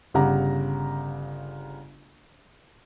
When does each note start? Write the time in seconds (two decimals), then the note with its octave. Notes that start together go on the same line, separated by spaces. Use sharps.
0.14 G1 C#3 G4 F#5 A#5